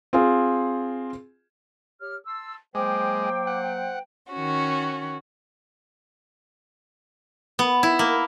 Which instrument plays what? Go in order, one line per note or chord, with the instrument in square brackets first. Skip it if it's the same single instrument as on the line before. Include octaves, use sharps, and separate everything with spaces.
[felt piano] C4 F4 G#4
[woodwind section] G4 C#5 F6
A5 C6 E6
[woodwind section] F#3 A#3 G5 [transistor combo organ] G#3 [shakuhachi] C5 [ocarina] D6
[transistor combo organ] F#5
[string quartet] D#3 C#4 F#4
[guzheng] B3
E4
A#3